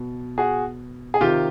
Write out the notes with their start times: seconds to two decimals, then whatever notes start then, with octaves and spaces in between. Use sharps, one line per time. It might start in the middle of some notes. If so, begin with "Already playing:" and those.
Already playing: B2
0.38 F#4 G#4
1.14 G#4
1.21 C3 D#3 F4 G4